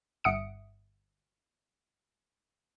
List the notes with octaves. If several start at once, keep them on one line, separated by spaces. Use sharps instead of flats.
G1 E5 F#5 D#6 C#7 D7